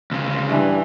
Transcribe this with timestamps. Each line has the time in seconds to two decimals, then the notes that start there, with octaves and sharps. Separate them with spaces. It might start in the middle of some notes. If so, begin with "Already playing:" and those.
0.11 D2 C#3
0.50 G2 E3